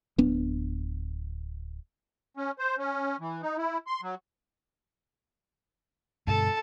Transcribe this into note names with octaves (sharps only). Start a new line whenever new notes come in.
D1 B3 D4
C#4
C5
C#4
E3
D#4
E4
C6
F#3
G2 B2 D3 A4 A5